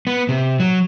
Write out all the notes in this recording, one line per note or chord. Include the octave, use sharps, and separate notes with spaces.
B3
C3
F#3